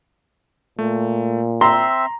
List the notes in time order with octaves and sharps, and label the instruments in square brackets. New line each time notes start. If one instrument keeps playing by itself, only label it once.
[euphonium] A#2 [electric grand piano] A3
[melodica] C4 E5 [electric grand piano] A#5 [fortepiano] C6